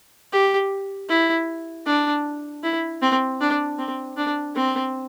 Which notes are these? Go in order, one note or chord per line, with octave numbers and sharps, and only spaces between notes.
G4
E4
D4
E4
C4
D4
C4
D4
C4